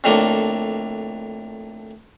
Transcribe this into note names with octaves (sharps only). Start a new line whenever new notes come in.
F2 A2 D3 A#3